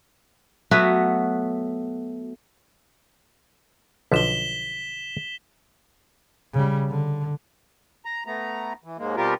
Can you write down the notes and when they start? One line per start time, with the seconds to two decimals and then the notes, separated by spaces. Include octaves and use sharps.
0.71 F#3 A3 B3 F#4
4.12 B1 D3 F3 B6 E7 G7
6.54 C#3 G3
6.89 D3
8.05 A#5
8.26 A3 B3 A#5
8.84 E3
8.98 D#2 G#2 G#3 A#3
9.17 B2 G3 C4 F4 G4 A#4